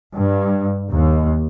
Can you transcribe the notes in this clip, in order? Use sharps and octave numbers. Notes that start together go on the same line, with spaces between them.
G2
D#2